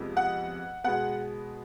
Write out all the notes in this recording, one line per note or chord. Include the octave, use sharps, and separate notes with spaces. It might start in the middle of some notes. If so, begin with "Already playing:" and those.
Already playing: F2 C3 F3 G#3 B3
F#5
B2 G#3 B3 F#5